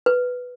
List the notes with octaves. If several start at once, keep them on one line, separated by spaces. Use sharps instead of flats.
B4